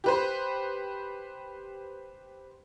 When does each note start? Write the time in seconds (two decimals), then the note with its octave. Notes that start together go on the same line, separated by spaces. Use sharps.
0.04 G4 B4 C5